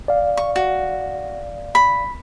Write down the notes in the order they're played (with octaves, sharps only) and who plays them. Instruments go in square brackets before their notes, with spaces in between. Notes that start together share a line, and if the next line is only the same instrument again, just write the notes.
[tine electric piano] D5 F5
[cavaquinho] C#6
F#4
B5